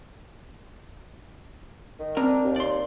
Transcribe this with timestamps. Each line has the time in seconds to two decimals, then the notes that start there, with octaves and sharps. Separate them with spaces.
1.99 D#3
2.17 C4 D4 A#4
2.44 D#2
2.56 D5 C6